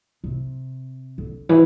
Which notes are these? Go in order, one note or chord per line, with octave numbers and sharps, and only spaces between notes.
C3
D3
E3